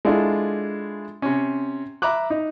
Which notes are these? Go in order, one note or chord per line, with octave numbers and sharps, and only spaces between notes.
G#3 D4 E4 F4 A4
C3 C#4
E5 A#5 B5 D6 F#6
D#4